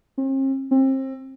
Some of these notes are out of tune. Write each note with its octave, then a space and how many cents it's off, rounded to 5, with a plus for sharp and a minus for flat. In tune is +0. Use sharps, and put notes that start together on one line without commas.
C4 +45
C4 +30